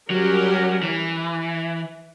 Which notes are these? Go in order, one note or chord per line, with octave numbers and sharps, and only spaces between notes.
F#3 G3 C#4 G4 A#4
E3